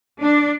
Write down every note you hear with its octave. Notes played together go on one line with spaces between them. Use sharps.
D4